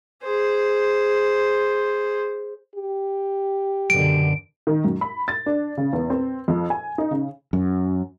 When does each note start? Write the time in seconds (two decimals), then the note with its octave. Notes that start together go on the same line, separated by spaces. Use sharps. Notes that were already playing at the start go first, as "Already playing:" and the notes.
0.23 G#4 C5
2.75 G4
3.90 F#2 B2 D3 D7
4.67 D#3
4.84 F#2
5.01 B5
5.28 A6
5.46 D4
5.77 C#3
5.93 E2
6.10 C4
6.48 F2
6.70 G#5
6.98 D#4
7.11 C#3
7.53 F#2